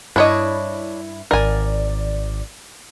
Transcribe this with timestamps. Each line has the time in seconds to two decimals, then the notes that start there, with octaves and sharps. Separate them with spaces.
0.16 G2 D4 E4 C#5 D#5
1.31 G#1 A#4 D5 G#5